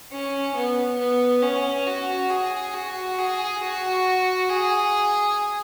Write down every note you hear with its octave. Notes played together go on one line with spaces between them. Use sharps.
C#4
B3
B3
C#4
F#4
G#4
F#4
G#4
F#4
G#4